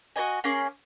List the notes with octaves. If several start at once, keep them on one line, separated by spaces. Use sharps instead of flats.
F#4 A#4 D#5 G#5
A#3 C#4 G#4